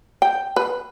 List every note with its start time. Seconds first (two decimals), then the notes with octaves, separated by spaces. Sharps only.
0.22 G5
0.56 B4